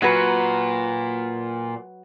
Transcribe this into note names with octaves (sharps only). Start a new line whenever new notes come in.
A#2 F#3 F#4 B4